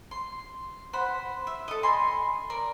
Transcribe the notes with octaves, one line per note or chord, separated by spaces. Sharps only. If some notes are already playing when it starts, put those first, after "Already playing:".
C6
C5 F#5 B5
E5
A4 D#5
D#5 G#5 B5 C6
A#4 D5